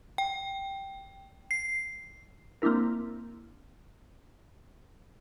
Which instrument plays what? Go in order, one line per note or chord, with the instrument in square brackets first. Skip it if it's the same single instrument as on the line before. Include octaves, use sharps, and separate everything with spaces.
[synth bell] G5
C7
[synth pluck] A#3 C4 D4 E4 A#4